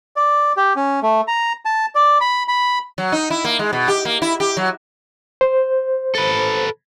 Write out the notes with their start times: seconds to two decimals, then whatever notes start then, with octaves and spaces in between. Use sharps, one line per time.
0.16 D5
0.57 G4
0.76 C#4
1.03 A3
1.28 A#5
1.65 A5
1.95 D5
2.21 B5
2.48 B5
2.98 F#3
3.12 D#4
3.30 E4
3.44 A#3
3.59 G#3
3.73 B2
3.88 G4
4.05 A#3
4.22 E4
4.40 G4
4.57 F#3
5.41 C5
6.15 A4 B4